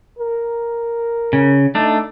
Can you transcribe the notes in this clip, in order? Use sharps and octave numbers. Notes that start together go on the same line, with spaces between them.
A#4
C#3
A3 D4 D#4